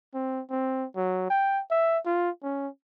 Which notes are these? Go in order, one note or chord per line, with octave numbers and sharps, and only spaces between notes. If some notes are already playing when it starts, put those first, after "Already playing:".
C4
C4
F#3
G5
E5
F4
C#4